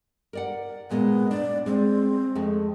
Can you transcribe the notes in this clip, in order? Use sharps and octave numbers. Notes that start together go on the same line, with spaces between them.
A#4 D5 F#5
A#2 G#3 A#3 B3
D4 D5
G#3 C4
F2 G#3 A3